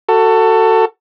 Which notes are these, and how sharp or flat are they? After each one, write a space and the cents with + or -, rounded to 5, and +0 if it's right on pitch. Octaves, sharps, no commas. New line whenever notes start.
F#4 +15 A4 +20